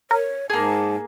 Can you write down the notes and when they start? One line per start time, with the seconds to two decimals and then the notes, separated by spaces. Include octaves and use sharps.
0.11 A#4 C#5
0.50 G#2 A#3 G#4 A5